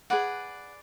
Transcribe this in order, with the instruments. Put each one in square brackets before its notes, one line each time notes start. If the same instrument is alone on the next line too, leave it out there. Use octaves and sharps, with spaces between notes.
[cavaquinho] G#4 B4 D5 F#5